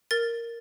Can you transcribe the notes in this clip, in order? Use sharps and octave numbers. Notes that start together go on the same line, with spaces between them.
A#4 A6